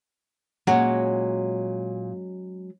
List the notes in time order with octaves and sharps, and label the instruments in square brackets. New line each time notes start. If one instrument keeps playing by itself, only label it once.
[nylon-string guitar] A#2 [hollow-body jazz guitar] F#3 G#3 C#4 [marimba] F#5